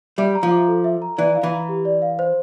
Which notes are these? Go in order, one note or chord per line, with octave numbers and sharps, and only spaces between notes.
G3 E5
A#5
F3
D6
A4
E5
A#5
E3 D5
F5
E3
A#5
G4
D5
F5
C5